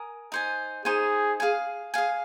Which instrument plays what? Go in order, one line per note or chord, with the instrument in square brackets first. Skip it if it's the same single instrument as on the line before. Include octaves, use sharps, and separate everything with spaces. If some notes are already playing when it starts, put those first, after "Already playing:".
Already playing: [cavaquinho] A#4 G#5 D#6
D#4 C5 G#5
[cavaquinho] D#4 C5 G#5 [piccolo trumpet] G#4
[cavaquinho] G#4 F5 G#5
G#4 F5 G#5